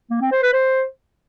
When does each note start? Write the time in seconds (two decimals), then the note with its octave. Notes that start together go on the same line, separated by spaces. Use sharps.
0.10 A#3
0.21 C4
0.32 C5
0.42 B4
0.53 C5